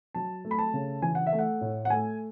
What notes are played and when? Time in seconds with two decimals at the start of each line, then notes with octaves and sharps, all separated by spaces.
0.15 F#3 A5
0.45 A3
0.51 B5
0.59 A5
0.74 C#3
1.02 E3 G#5
1.15 F#5
1.27 E5
1.33 A3
1.39 F#5
1.61 A2
1.85 F#5
1.90 A3 G#5